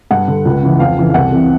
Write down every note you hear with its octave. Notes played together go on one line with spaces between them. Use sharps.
G2 F#5
D3
C#2
C#3 E3
F2 F5
C#3 E3
F5
C2 F#5
C3 E3